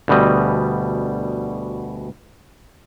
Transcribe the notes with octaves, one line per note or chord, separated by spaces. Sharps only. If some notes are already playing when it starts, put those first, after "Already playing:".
D2 B2 G3 D#5